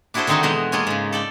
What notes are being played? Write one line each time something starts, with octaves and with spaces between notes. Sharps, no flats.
D4 E4 F#4 G#4 A4 C5
D3 D#3 G#3 C4 D#4 F#4
E2 B2 G#3 D#5
G#3 A#3 F4 C#5 G#5
G#2 C#3
A4 D5 G5